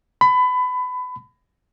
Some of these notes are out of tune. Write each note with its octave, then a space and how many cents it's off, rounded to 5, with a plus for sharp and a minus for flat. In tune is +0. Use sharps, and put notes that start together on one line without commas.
B5 +25